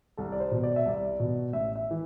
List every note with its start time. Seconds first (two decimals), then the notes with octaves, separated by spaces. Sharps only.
0.17 C2 A4
0.32 D5
0.40 C5
0.51 B2
0.63 D5
0.76 E5
0.86 C2 D5
1.20 B2
1.52 A1 E5
1.75 E5
1.91 E3